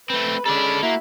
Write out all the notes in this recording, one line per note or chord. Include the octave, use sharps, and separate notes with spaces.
A3 C4 B4
G#3 C#4 A4 D5 B5
A#3 E4 F#4